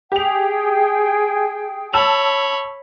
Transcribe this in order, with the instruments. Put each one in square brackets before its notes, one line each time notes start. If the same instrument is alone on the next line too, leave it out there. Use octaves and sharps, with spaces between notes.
[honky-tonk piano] G4 F7 [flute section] G#4 G5
[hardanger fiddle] C#5 B5 [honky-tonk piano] A5 E6 F7